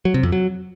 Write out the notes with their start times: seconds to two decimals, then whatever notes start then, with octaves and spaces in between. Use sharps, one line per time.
0.05 F#3
0.14 C3
0.23 F2
0.32 F#3